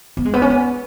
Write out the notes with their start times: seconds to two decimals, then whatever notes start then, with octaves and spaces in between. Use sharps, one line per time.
0.17 B3
0.25 G#3
0.34 B3
0.42 C#4
0.50 B3